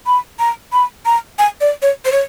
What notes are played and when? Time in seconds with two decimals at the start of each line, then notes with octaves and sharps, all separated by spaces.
0.07 B5
0.39 A#5
0.73 B5
1.06 A#5
1.39 G#5
1.61 D5
1.82 C#5
2.05 C5
2.12 C#5